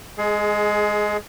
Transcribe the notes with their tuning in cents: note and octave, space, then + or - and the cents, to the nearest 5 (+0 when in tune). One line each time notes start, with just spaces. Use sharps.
G#3 +0 G#4 +25